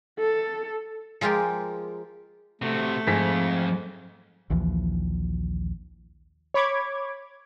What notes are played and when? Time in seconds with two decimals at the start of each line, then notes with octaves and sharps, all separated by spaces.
0.19 A4
1.21 F3 G#3 F4 G4 A#4
2.62 C3 A3 F#4
3.07 F2 G#2 G#4 B6
4.50 A#1 D#2 E3 F3
6.54 C#5 B5 D6 G#6